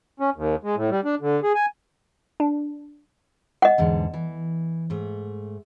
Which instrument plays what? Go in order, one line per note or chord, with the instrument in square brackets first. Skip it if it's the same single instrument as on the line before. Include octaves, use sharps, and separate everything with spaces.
[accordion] C#4
D#2
G#3
A2
G3
D4
D3
G#4
G#5
[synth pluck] D4
[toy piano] D#5 F#5
[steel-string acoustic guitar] E2 G#2 D3
E3
G#2 A3